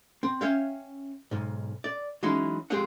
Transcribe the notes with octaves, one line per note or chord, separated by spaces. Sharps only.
C4
C#4 C#5 E5 F5 G5
B1 G#2
D5
E3 F#3 G#3 C#4 D#4 E4
F2 G#3 C4 G4 G#4 F#5